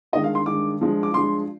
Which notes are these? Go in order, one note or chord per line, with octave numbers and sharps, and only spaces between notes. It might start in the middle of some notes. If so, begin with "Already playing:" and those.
G2 D#3 G#3 D#5
F5
C6
G2 D#3 G#3 D6
G2 F3 G#3
D6
G2 F3 G#3 C6